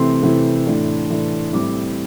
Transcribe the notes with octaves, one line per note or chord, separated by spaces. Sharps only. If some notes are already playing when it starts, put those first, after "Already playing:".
Already playing: C3 E3 A3 C4 C6
C3 E3 A3 C4
A2 E3 A3 D4
A2 E3 A3 D4
A2 G3 C4 D6